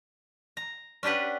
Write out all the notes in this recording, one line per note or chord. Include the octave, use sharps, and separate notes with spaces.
A#5
C#4 D4 G4 B4 F#5